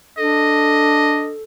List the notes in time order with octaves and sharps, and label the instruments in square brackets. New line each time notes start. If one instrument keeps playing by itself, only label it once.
[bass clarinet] D4 [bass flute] A4 [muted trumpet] D#5